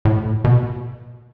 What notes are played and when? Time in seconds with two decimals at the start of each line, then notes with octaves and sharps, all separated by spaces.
0.05 A2
0.44 B2